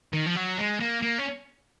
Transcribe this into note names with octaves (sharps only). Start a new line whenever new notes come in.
D#3
F3
F#3
G#3
A#3
A#3
C#4